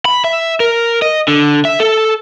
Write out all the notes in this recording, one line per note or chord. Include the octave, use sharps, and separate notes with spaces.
B5
E5
A#4
D#5
D3
E5
A4